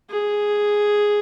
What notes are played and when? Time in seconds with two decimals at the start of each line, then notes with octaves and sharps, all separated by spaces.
0.10 G#4